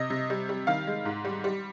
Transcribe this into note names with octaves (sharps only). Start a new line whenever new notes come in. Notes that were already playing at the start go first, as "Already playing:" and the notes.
Already playing: C3 D#5
C3
G3
G3
D#3 F5
G#3
G#2
G3
G3